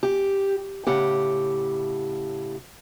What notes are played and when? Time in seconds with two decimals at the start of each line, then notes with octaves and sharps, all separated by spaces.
0.03 G4
0.87 A2 C#3 G4 F#5